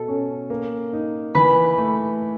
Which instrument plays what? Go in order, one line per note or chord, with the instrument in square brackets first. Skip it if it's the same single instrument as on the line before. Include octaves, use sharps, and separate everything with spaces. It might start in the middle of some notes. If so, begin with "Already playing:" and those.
Already playing: [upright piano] B2 [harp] A4
[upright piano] C#4
A#3
D#4
[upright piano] E3 [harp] B4 B5
[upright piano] A3